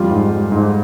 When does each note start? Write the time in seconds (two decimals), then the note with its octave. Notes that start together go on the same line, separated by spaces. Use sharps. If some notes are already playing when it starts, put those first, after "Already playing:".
Already playing: F2 G3 F4
0.11 G#2
0.32 G3
0.52 G#2